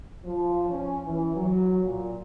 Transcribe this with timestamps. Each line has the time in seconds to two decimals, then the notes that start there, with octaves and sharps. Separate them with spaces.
0.24 F3
0.69 C#4
1.05 E3
1.36 F#3
1.84 A#2